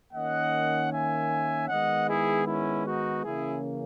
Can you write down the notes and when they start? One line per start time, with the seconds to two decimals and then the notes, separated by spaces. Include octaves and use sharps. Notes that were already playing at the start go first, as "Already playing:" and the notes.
0.13 D#3 A#3 C#4 D#5 F#5
0.91 E5 G#5
1.69 D#3 G#3 B3 D#5 F#5
2.08 E4 G#4
2.47 C#4 E4
2.87 D#4 F#4
3.25 C#3 E3 A#3 C#4 E4 G#4